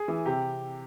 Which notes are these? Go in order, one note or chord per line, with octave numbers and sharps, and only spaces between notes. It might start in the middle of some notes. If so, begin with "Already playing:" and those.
Already playing: G#4
E3
C3 G4